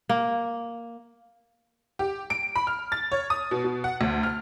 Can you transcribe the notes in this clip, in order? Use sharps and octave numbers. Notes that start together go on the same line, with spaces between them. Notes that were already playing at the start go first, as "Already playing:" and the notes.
A#3
G4
D7
B5
F6
A6
C#5
D#6
B2
B2
F#5
D2
F6